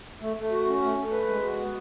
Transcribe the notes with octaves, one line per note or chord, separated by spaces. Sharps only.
A3
A3
F#4
C#4
A3
A3
B4
G#3
F#4
B3